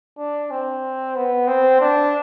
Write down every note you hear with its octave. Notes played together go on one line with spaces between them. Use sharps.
D4
C4
B3
C4
D4